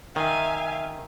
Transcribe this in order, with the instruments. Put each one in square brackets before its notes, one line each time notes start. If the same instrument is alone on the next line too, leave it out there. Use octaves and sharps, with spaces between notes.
[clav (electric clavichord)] D#3 [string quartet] E5 F5 G#5